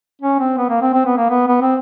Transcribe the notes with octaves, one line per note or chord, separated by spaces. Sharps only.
C#4
C4
B3
A#3
C4
C4
B3
A#3
B3
B3
C4